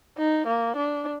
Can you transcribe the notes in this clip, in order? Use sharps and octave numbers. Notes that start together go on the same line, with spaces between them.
D#4
A#3
D4